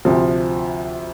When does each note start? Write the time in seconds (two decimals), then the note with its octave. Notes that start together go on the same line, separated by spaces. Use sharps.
0.05 D2 C3 F3